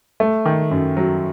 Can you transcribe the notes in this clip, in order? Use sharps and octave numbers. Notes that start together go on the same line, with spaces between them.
A3
D#3
F#2
F#3